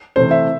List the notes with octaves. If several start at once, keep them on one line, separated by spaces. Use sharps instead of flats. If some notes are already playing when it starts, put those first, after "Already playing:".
C3 E3 A3 C5
E5